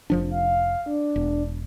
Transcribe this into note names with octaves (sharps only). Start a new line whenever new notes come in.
F1 F3 D4
F5
D4
E1